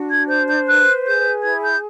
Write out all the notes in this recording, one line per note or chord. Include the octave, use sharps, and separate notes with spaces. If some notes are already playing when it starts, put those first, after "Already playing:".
Already playing: D4 F#4
G#6
C5 G6
G6
B4 F#6
G#4 G6
E4 G#6
G6